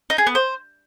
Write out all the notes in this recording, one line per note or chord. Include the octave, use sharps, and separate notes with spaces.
D#4
G#4
B3
C5